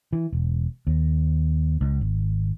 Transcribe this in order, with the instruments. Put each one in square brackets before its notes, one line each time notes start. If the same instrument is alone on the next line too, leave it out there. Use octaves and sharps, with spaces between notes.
[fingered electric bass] E3
E1
D#2
C#2
G#1